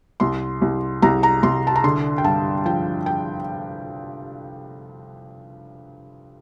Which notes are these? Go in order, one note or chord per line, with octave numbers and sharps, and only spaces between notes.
C2 C6
C2
C2 A#5
A#5
C2 C6
A5
A#5
D3 C6
G5
G2 A5
F3 G5
G5